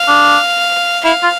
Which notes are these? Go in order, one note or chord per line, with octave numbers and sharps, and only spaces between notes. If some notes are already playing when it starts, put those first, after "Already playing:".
Already playing: F5
D4
E4 F5
F4